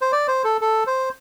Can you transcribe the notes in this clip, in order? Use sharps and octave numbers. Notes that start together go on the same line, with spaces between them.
C5
D5
C5
A4
A4
C5